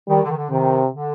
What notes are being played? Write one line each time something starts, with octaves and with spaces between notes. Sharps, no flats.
D#3 G3
D3
D#3
D3
C3 D#3
D3